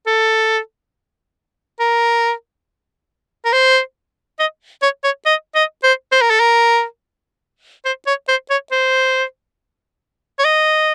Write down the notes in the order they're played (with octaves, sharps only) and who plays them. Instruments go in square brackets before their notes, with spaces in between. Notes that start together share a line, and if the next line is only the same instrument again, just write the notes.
[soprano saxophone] A4
A#4
A#4
C5
D#5
C#5
C#5
D#5
D#5
C5
C5
A#4
A4
A#4
C5
C#5
C5
C#5
C5
C#5
D#5